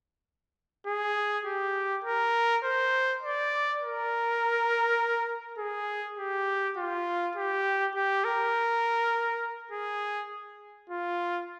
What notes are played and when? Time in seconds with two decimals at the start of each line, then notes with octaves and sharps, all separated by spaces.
0.86 G#4
1.46 G4
2.05 A#4
2.64 C5
3.23 D5
3.82 A#4
5.59 G#4
6.18 G4
6.77 F4
7.36 G4
7.95 G4
8.24 A#4
9.72 G#4
10.90 F4